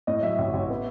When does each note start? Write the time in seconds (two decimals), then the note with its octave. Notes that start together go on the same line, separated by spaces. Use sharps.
0.07 A2 D#5
0.22 F#3 E5
0.38 A1
0.53 A1
0.70 B3